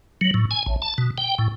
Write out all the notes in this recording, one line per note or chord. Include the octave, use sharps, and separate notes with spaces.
F#3
A2
G#5
A1
A5
B2
G5
A2